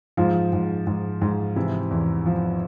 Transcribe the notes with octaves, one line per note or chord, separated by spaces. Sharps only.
G#2 F3 F4
G#2
G#2
G#2
C3 E3 E4
E2
F3